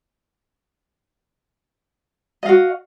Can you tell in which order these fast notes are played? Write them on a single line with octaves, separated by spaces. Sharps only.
D#5 F5 F#4